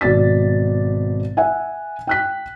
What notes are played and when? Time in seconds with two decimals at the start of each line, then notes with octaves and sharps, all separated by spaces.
0.01 G#1 B2 D5 A6 B6
1.37 E5 F#5 G#5
2.07 G5 F#6 B6